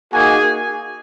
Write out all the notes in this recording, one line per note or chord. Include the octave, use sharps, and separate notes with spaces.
A#3 D#4 F#4 G#4 G#5